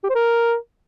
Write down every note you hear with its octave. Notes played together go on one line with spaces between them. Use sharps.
G4
C5
A#4